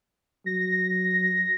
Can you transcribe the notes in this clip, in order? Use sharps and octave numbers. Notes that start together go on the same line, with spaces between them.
F#3 A#6